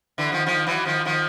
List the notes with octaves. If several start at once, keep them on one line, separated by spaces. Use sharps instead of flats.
D3 E3
D#3 F3
D#3 F3
E3 F#3
D#3 F3
D#3 F3